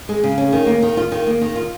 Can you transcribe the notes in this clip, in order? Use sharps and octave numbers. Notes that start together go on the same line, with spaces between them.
G#3
C#3
C#4
D#3
A#3
D#3
F4
D#3
A#3
D#3
F4